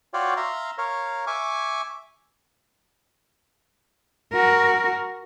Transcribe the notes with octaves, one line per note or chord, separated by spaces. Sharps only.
F4 F#4 C#5 D5 F5 G5
E5 F5 A#5 C6
A#4 C#5 F5
E5 G#5 C#6 D6
F#4 A#4